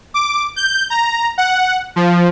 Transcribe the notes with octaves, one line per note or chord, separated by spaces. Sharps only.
D6
G6
A#5
F#5
F3